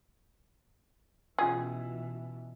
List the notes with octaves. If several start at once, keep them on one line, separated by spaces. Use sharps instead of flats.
B2 E3 C#4 F4 G#4 G5